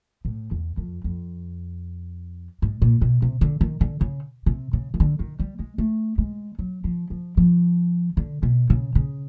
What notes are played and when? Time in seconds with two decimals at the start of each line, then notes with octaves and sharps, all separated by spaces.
0.25 A2
0.51 E2
0.77 F2
1.04 F2
2.62 G#2
2.82 A#2
3.01 B2
3.22 C3
3.41 D3
3.61 D#3
3.81 D3
4.01 C#3
4.46 C3
4.73 C#3
4.94 D#3
5.00 D3
5.19 D#3
5.39 G3
5.59 G#3
5.78 A3
6.18 G#3
6.59 F#3
6.84 F3
7.10 F3
7.37 F3
8.17 D3
8.43 B2
8.70 C#3
8.95 C#3